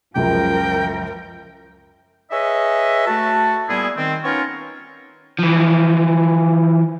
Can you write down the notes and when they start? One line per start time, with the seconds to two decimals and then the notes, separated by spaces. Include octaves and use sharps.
0.15 C#2 F#2 C#3 F3 A#4 G5
2.31 G#4 B4 C#5 D#5 E5
3.07 A3 F#4 A5
3.69 A#2 G3 B3 E4 G#4
3.96 D#3 C4
4.24 B3 C#4 D#4 F4 A#4 C#5
5.39 E3 F3